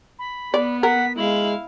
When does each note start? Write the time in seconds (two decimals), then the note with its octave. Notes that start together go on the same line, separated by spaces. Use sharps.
0.19 B5
0.54 B3 D5
0.83 A#4 F#5 B6
1.17 G#3 E4 F5 F#7